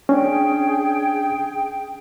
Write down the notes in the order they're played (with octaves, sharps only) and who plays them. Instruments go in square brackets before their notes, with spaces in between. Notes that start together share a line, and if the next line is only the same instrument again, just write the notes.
[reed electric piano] C#4 D4 [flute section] G#4 G5